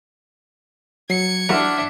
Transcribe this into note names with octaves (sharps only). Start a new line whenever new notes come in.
F#3 G#6 C#7
E3 F#3 D4 A#4 E5 F#5 C6 F6